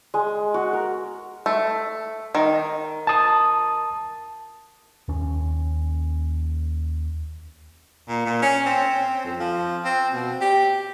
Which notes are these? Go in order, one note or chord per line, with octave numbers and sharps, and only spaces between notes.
G#3
F#4
A#4
A3
D#3
A5 D#6
D#2 C#4
A#2
A#2
C#4
C4
F2
F3
C4
B2
G4